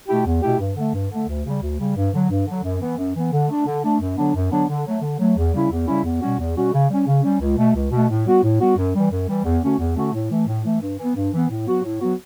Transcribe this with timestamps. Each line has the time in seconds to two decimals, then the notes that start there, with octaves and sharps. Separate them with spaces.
0.08 B2 A3 E4 G4
0.26 E2
0.43 B2 A3 E4 G4
0.59 G2
0.76 D3 A3
0.94 G2
1.10 D3 A3
1.28 D2
1.45 C#3 G3
1.62 D2
1.79 C#3 G3
1.96 G2
2.13 D3 F#3
2.30 G2
2.46 D3 F#3
2.64 F#2
2.81 E3 B3
2.97 F#2
3.14 E3 B3
3.32 D3
3.48 A3 D4
3.66 D3
3.83 A3 D4
4.01 F#2
4.17 D3 F#3 B3 D4
4.35 F#2
4.51 D3 F#3 B3 D4
4.69 D3
4.86 F#3 A3
5.02 D3
5.19 F#3 A3
5.37 E2
5.53 C#3 G3 C#4 E4
5.71 E2
5.87 C#3 G3 C#4 E4
6.04 E2
6.21 B2 G3 C#4 F#4
6.39 E2
6.56 B2 G3 C#4 F#4
6.73 C#3
6.90 G3 C#4
7.06 C#3
7.23 G3 C#4
7.40 C#2
7.57 B2 A3
7.75 C#2
7.91 B2 A3
8.09 A2
8.26 G3 B3 F#4
8.43 A2
8.60 G3 B3 F#4
8.77 F#2
8.94 E3 G3
9.11 F#2
9.28 E3 G3
9.45 E2
9.62 D3 A3 C#4 F#4
9.79 E2
9.96 D3 A3 C#4 F#4
10.13 A2
10.29 E3 A3
10.47 A2
10.64 E3 A3
10.81 G2
10.98 E3
11.03 B3
11.15 G2
11.32 E3 B3
11.49 A2
11.67 F#3 B3 F#4
11.84 A2
12.01 F#3 B3 F#4